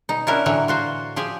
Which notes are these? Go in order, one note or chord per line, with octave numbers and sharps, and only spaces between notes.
B2 D#4
C#4 D4 E4 F#4 A#4
A2 D3 E3 F#3 C#5
F4 F#4 C5
F3 G4 G#4 G5